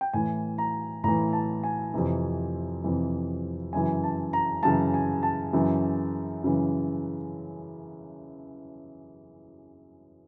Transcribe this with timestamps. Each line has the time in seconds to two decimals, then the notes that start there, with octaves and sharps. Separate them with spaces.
0.01 G5
0.13 A2 E3 G#5
0.58 A#5
1.04 A2 E3 A#5
1.33 A5
1.64 G#5
1.94 F2 C3 E3
2.84 F2 C3 E3
3.73 F#2 C#3 E3 G#5
4.04 A5
4.33 A#5
4.63 F#2 C#3 E3 A5
4.94 G#5
5.23 A5
5.53 F#2 C#3 E3
6.44 F#2 C#3 E3